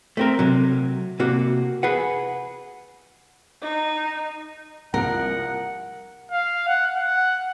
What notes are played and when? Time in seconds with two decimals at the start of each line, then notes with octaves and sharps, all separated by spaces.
0.17 A3 C4 A#4
0.39 C3 F#3
1.19 C3 A#3 F#4
1.83 G#4 B4 F#5
3.62 D#4
4.94 C2 F3 A#4 F#5 D7
6.32 F5
6.68 F#5
6.97 F#5